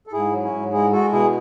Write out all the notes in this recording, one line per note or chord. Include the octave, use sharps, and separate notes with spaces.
A4
G#2 E4 G#4
F#3
C#4 E4
G#2
G#3 E4 G#4
G#3 F#4 A4
B2 E4 G#4